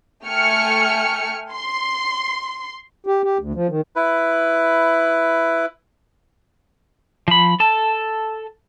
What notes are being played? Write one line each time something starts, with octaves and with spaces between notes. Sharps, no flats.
A3 G5 G#5 F6 C#7
C6
G4
G4
D2
F3
D#3
E4 B4
F3 B5
A4 A5